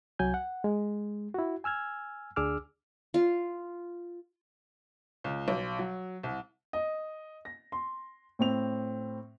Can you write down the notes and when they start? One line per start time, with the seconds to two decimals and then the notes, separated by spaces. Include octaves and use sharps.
0.19 C2 F#3 G#5 G6
0.34 F#5
0.64 G#3
1.34 E4 F#4
1.64 G#5 E6 F6 G#6
2.36 D2 D4 G#4 D6 E6 F6
3.14 F4
5.24 C#2
5.48 B1
5.79 F#3
6.23 C2
6.73 D#5
7.45 A#6
7.72 C6
8.39 A2 C4 F7